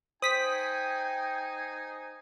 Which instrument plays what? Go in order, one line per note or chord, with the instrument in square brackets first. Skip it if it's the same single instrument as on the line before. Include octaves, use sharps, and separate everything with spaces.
[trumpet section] D#4 G#4 G#5 [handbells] C5 [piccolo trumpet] G5 [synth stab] D#6 B6